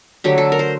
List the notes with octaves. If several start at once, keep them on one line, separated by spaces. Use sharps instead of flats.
D3 F#3 A3 G4
A4
A#4
C5